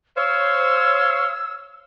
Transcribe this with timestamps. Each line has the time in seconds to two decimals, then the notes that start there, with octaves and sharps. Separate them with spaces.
0.17 C5 C#5 F5 E6